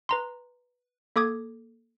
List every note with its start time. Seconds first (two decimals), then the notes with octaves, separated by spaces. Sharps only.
0.09 B4 A#5 C6
1.16 A#3 A4 D6 D#6 G#6